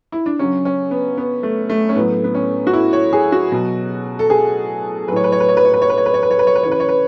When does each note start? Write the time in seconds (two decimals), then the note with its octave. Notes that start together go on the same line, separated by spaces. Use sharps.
0.12 E4
0.26 D4
0.39 C#3 F#3 C#4
0.65 C#4
0.91 B3
1.18 B3
1.43 A3
1.70 A3
1.89 C#4
1.96 A2 F#3 B3
2.24 B3
2.35 C#4
2.67 F#4
2.73 E4
2.93 C#5
3.13 G#4
3.32 F#4
3.52 B2 F#3
4.19 A4
4.30 G#4
5.08 F#3 B4
5.12 A2 C#5
5.24 B4
5.32 C#5
5.40 B4
5.48 C#5
5.57 B4
5.65 C#5
5.73 B4
5.82 C#5
5.90 B4
5.98 C#5
6.06 B4
6.14 C#5
6.23 B4
6.31 C#5
6.39 B4
6.47 C#5
6.55 B4
6.63 C#3 E3 C#5
6.71 B4
6.80 C#5
6.88 B4